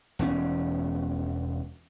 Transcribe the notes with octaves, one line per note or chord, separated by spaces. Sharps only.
E1 E2 C#4